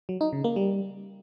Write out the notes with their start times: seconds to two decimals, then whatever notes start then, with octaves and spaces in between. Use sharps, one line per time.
0.09 F#3
0.21 D#4
0.33 C#3
0.44 A#3
0.56 G3